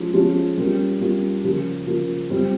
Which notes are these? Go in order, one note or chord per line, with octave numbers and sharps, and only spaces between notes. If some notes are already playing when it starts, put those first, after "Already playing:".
Already playing: F3 G#3 C#4 F4
F3 G#3 C#4 F4
G3 A#3 C#4 F4
G3 A#3 C#4 F4
C#3 F3 A#3 F4
C#3 F3 A#3 F4
G3 C4 F4